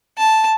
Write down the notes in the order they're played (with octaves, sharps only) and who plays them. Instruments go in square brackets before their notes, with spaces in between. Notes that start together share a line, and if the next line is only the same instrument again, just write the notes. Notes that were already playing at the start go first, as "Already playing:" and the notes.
[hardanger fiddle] A5